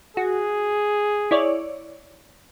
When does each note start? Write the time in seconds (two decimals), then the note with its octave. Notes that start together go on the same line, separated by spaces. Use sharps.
0.17 F#4 G#4
1.31 E4 C#5 D5